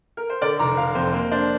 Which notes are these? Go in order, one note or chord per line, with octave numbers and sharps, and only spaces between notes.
A#4
C5
D3 A#4 D5
F1 A#5 D6
F1 F5 A#5
F2 C5
A#3 C5
D4 C5